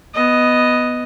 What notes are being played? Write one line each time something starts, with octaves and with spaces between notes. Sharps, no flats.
B3 D#5